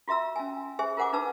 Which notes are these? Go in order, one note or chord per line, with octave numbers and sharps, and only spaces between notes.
F4 F#4 E5 A#5 E6
C#4 G#5
G4 G#4 C5 E5 G#5
F4 A#4 C5 F#5 G#5 D6
D4 D#4 B4 A5 E6